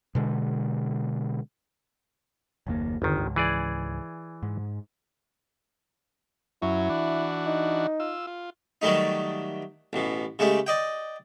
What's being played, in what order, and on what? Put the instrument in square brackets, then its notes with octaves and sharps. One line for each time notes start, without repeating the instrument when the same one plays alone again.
[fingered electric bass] B2 D3 G#3
[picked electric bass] F#1 D#2 A#3
[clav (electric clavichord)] G1 D#3 [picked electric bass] E2 D3
[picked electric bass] C#2 G#2
[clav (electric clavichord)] E3 G#4 D5
[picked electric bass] G#2
[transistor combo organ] F#2 F#3 C#4 [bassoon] E4
[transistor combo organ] E3 D4 F#4
[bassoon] D#4
[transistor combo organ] F4 E6
F4
[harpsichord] D#3 F#3 G3 A3 D#4
A1 B2
C#3 G#3 A3 G4
D5 D#5 G5